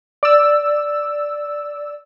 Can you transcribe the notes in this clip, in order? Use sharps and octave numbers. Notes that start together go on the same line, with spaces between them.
D5 E6